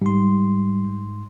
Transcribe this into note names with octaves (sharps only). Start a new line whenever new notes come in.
G#2 G3 C6